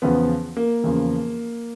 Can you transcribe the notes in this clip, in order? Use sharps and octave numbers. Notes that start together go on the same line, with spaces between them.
E2 C#3 F3 B3
A#3
E2 C#3 F3